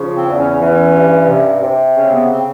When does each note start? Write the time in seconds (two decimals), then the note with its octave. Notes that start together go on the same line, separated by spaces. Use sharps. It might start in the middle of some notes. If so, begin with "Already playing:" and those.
Already playing: C#3 F3
0.15 C4
0.27 E2
0.38 C#4
0.60 E3 C#4
0.94 G2
1.28 C3
1.63 C3
1.96 C#3 C#4
2.07 C4
2.14 B3
2.31 C4